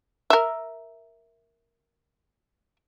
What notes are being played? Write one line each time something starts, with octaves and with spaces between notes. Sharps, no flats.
A#4 E5